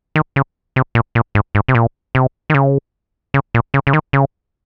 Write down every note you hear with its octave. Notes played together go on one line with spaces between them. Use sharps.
D#3
C#3
C3
A#2
A#2
G#2
G#2
C3
A#2
C3
D#3
C#3
C#3
A#2
C#3
C#3
D#3
C#3